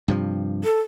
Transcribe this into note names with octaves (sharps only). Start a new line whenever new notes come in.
G2 C3 F3
A4